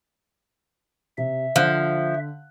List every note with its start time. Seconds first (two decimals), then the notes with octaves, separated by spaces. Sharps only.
1.18 C3 E5
1.56 D3 F3 F#6